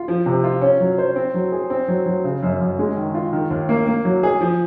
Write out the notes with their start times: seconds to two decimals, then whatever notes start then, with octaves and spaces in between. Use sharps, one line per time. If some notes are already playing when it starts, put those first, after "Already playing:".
Already playing: F4
0.08 F3
0.26 C3
0.44 F4
0.62 C#4
0.80 F#3
0.98 C5
1.16 C4
1.34 F#3
1.52 G#4
1.70 C4
1.88 F#3
2.06 F#3
2.24 C#3
2.43 F#2
2.60 F#2
2.79 G#3
2.97 D#3
3.15 F4
3.33 D#3
3.50 D#2
3.69 A#3
3.87 A#3
4.05 F#3
4.23 G#4
4.41 F3